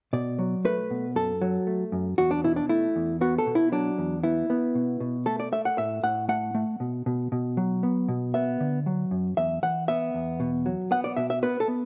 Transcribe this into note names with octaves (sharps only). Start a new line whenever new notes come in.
B2 D5
F#3
A3 B4
B2
F#2 A4
F#3
A3
F#2
E2 F#4
D4
B2 E4
D4
A3 E4
E2
B3 F#4
A4
B2
E4
F#3 D4
E2
B3 E4
B3
B2
B2
A3 A4
D5
A3 E5
F#5
A2 E5
A2 F#5
A3 F#5
A3
B2
B2
B2
F#3
B3
B2
B3 E5
D3
F#3
F#2
E2 E5
E3 F#5
B3 E5
E2
B2
F#3
B3 F#5
D5
B2 E5
E5
B3 B4
A4
B3